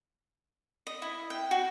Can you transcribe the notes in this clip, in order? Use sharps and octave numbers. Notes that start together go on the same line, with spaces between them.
D#5
E4
G5
F#4